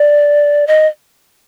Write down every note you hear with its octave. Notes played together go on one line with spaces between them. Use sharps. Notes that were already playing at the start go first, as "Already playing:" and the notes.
Already playing: D5
D#5